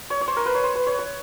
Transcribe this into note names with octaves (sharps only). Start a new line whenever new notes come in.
C#5
C#5
C5
A#4
B4
C#5
C5
B4
C#5
C#5